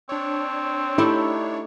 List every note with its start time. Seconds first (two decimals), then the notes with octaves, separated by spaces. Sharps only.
0.09 C4 D4 C#5
0.98 A3 D#4 E4 G4